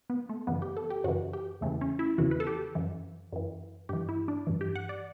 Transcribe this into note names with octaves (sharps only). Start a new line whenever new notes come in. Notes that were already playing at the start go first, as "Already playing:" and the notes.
B3
A3
F#2 C#3 E3 B3
G4
A4
G4
F#2 C#3 E3 F#4
G4
E2 C#3 E3 A3
C#4
E4
E2 C#3 E3 F#4
B4
A4
G4
F#2 E3
F#2 E3
G2 E3 G4
E4
D4
G2 E3
G4
F#5
D5